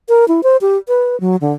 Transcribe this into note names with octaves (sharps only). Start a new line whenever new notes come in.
A#4
E4
C5
G4
B4
F#3
D3